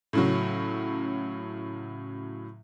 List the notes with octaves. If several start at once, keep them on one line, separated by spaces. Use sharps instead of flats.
A2 C#3 F#3